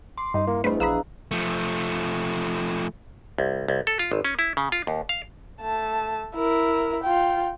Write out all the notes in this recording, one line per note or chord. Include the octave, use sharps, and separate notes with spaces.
C6 D6 C7
G2 D#4
A#3 E4
E2 G3 A3 D4 B4 C5 D#5
A#1 G#4 F5 A#5 B5 E6 F#6
F3 A3
C2
C2
A4
F4
G#1
C#4
E4
C#3
F4
D#2
F5
A3 A5
E4 A#4
F4 G5